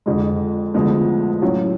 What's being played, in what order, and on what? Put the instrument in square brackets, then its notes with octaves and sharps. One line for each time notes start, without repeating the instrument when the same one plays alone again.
[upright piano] F2 D3 G#3
D2 D3 F3 G#3 B3
A2 F#3 C#4 F4